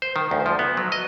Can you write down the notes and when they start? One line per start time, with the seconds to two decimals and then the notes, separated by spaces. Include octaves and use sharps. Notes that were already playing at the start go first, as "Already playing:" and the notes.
0.02 C5
0.16 D#3
0.31 D2
0.46 F3
0.59 B3
0.77 F#3
0.92 D#5